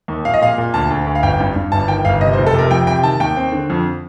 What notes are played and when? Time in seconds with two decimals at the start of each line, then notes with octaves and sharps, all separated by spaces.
0.08 D#2
0.25 A#1 F5
0.34 D#5
0.42 A#2 F5
0.58 A#2
0.74 D2 A5
0.90 D2
1.07 D2
1.15 F5
1.23 G1 G5
1.40 G2
1.56 G2
1.72 G1 A5
1.88 D#3 G5
2.05 G1 F5
2.21 C3 D#5
2.33 C5
2.38 F1
2.46 A4
2.54 C3 A#4
2.71 F2 G5
2.87 C3 G5
3.04 D#3 A5
3.20 D#2 G5
3.37 C4
3.52 D3
3.70 F2